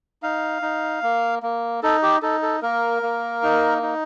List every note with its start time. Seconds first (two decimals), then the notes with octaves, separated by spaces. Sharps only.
0.23 D#4 F5
0.62 D#4
1.03 A#3
1.43 A#3
1.83 D#4 A4
2.02 G4
2.22 D#4 A4
2.42 A4
2.62 A#3 A#4
3.03 A#3
3.43 D#4
3.82 D#4